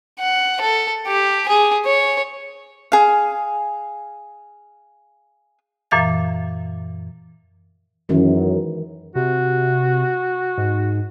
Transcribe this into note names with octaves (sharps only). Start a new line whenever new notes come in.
F#5
A4
G4
G#4
C#5
G#4 F5
F#2 A#2 E3 F5 A6
F#2 D#3 E3 G#3
C3 F#4
G#2